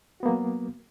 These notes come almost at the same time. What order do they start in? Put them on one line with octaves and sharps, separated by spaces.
F#4 B3 A#3 F#3